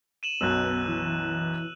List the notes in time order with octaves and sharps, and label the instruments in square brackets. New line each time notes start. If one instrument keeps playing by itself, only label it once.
[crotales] D#7 E7 F#7
[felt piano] B1 F#2 B2 [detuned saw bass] B3 [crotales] E6 F#6
[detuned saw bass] E3